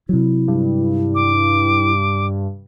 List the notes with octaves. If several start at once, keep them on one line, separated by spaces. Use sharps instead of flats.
C3 F#3 E4
G2
D6